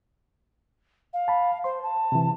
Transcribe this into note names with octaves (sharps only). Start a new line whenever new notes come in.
F5
A5 B5
C5 C6
A5
C3 E3